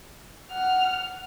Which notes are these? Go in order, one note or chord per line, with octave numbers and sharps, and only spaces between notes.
F#5 F6